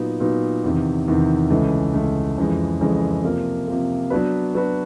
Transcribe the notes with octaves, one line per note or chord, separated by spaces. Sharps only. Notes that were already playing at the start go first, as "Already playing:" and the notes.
Already playing: A#2 F#3 B3 D#4
A#2 F#3 B3 D#4
E2 C3 D#3
E2 C3 D#3
C#2 C#3 E3 A3
C#2 C#3 E3 A3
F2 C#3 E3 G#3
F2 C#3 E3 G#3
C3 F3 A#3
C3 F3 A#3
F#3 B3 D4 F#4 B4
F#3 B3 D4 F#4 B4